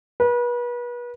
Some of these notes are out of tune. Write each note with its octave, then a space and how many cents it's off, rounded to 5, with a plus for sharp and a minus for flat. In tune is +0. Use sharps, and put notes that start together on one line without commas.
B4 -35